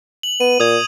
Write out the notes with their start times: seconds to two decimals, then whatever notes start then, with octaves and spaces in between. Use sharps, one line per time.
0.23 F#7
0.40 B3 D#7
0.60 A#2 D#6 G#6